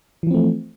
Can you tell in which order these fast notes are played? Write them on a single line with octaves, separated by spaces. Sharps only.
E3 F3 C4 A3